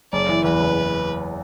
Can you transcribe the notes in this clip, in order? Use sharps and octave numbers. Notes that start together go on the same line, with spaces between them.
F#1 D5
E3
E2 B4
F#1